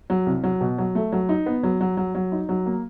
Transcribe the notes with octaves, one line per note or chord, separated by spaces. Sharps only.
F#3
C2
F#3
B2
F#3
A3
F#3
D#4
B3
F#3
F#3
F#3
F#3
D#4
F#3
A#3